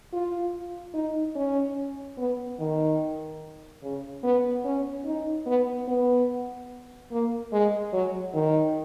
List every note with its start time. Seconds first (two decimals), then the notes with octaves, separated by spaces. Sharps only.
0.13 F4
0.94 D#4
1.36 C#4
2.18 B3
2.60 D#3
3.83 C#3
4.24 B3
4.65 C#4
5.06 D#4
5.47 B3
5.88 B3
7.12 A#3
7.53 G#3
7.93 F#3
8.34 D#3